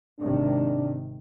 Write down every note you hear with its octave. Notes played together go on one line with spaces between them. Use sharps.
G#1 C3 D#3 D4